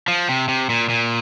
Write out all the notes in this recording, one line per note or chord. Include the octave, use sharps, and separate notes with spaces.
F3
C3
C3
A#2
A#2